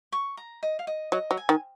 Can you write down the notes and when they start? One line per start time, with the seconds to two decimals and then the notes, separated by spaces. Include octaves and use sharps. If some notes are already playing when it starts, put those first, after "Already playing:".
0.12 C#6
0.37 A#5
0.63 D#5
0.79 F5
0.87 D#5
1.12 F#3 D#5
1.31 F#3
1.37 G#5
1.49 D#3